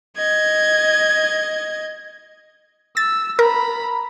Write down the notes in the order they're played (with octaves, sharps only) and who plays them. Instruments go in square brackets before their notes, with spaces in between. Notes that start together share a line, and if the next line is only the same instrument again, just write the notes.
[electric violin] D#5 G#6
[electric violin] E6 [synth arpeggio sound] A6
[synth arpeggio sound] A#4 [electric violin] A#5 B5